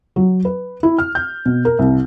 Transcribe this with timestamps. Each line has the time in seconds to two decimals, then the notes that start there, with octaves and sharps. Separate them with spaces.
0.16 F#3
0.45 B4
0.83 E4
0.98 F6
1.15 G6
1.46 B2
1.65 A#4
1.79 C2